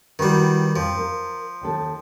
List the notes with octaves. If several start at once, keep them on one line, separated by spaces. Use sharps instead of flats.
D#3 G3 E4 F#4 B4
F2 F3
A#4
D#2 D#3 A4